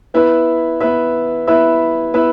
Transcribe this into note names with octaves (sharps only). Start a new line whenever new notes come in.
B3 E4 B4 E5
B3 E4 B4 E5
B3 E4 B4 E5
B3 E4 B4 E5